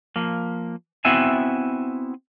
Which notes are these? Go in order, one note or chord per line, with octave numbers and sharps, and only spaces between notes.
F3 A#3
B3 C4 E4 F#4 E5 G#5